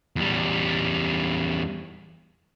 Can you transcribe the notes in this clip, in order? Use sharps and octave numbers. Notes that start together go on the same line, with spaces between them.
E2 G3